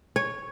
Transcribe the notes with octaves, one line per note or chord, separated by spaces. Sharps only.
C#5